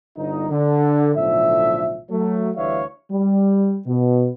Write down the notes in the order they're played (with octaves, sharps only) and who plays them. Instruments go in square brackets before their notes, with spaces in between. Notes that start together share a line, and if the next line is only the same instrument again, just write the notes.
[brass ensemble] G1 D#4
D3
B1 A2 D3 F3 E5
F#3 A3
D2 E3 G3 C#5 E5 F5
[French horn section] G3
B2